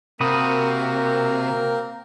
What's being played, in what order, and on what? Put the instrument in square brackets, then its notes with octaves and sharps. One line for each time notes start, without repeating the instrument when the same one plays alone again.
[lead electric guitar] C3 [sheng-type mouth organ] A#3 C4 A#4 [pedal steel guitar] F#4 B5 D#6